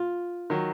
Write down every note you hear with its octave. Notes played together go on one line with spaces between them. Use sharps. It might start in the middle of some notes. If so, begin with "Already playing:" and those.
Already playing: F4
D#3 F#3